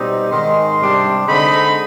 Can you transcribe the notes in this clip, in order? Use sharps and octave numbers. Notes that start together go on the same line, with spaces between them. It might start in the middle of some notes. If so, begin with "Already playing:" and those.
Already playing: B2 G3 C4 D#4
G#2 D#3 G#3 C6
C3 G3 D4
D3 G#3 C4 D#4 B5